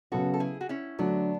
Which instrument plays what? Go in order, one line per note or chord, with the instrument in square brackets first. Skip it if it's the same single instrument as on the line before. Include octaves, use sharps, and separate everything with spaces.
[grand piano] C#3 F#3 B3 [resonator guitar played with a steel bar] F#4 A4
[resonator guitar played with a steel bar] A4
E4 G#4
F#4
C#4 E4
[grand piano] D3 F#3 A3 [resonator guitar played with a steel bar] B3 D4